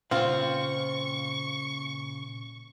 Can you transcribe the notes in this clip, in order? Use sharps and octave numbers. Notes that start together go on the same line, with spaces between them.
A#2 C#3 C4 F4 C#6